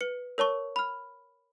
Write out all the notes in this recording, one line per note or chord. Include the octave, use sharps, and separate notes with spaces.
B4 C#7
A#4 C#5 A5 C#6
B5 F6